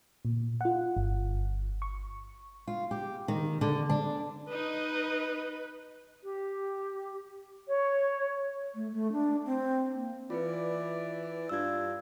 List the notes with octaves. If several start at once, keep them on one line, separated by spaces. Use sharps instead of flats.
A#2
F4 F#5
G1
C#6
F4
G4
D#3
D3
D4
D#4 B4 D#5
G4
C#5
A3
A3
D4
C4
A#3
E3 F4 B4 D5
G2 D4 F4 E6 G#6